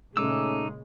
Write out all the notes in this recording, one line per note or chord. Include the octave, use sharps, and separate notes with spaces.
A#2 C#3 G#3 A3 C#4 D#4 D6 E6